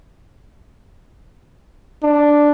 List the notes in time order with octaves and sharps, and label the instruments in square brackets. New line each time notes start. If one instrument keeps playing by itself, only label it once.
[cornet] D4